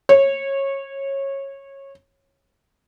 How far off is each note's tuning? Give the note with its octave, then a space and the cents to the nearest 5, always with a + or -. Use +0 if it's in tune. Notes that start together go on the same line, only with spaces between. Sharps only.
C#5 -20